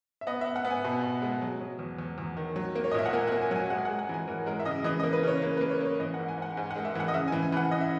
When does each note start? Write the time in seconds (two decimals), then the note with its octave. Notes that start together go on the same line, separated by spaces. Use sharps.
0.21 E5
0.27 B3 D#5
0.41 E5
0.46 B3
0.56 F#5
0.65 B3
0.70 G#5
0.85 B2
1.03 B2
1.22 G#3
1.42 F#3
1.61 F#3
1.79 E2
1.99 E2
2.18 E2
2.37 D#3
2.56 F#3
2.75 A#3
2.84 C#5
2.91 D#5
2.94 A#2 E5
3.06 F#5
3.13 A#3 G#5
3.27 F#5
3.32 A#3
3.42 G#5
3.51 F#3 F#5
3.56 G#5
3.70 G#3 F#5
3.78 G#5
3.85 F#5
3.89 G#3
3.99 F#5
4.09 E3 G#5
4.28 E3 A#4
4.46 G#3 A#4
4.60 E5
4.65 C#3 D#5
4.84 E3 D#5
5.00 D#5
5.03 A#3
5.13 B4
5.23 C#3 C#5
5.42 A#3
5.57 B4
5.61 A#3
5.70 C#5
5.80 A#3
5.85 C#5
6.00 E3 D#5
6.14 F#5
6.19 G#2
6.28 G#5
6.37 G#2 F#5
6.57 G#2 G#5
6.71 F#5
6.76 G#3
6.85 E5
6.95 E3 F#5
7.08 D#5
7.14 C#3 E5
7.28 G#5
7.32 E3
7.42 G#5
7.52 E3 F#5
7.71 C#3 D#5
7.81 E5